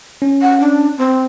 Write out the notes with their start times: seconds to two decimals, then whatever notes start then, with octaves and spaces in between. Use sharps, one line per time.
0.22 C#4
0.42 F#5
0.60 D4
0.98 C4